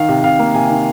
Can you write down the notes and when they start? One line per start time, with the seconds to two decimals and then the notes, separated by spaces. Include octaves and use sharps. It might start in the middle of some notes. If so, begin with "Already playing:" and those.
Already playing: D#3 F5
0.09 C3
0.23 C3 F5
0.39 A#3
0.54 C3 G#5
0.70 D#3